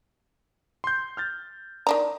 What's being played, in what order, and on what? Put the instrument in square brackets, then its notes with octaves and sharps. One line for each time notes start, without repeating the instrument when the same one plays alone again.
[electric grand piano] C6 G6
F6 G6 A6
[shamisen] D#3 D4 A#5 [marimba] D5